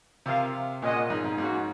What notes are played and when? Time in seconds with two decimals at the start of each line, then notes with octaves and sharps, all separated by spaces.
0.25 C3 F4 A#4 F5
0.82 A#2 G#3 C#4 G#4 D#5 F#5
1.10 G#2
1.24 G#2
1.38 G#2 A#3 C#4 F#4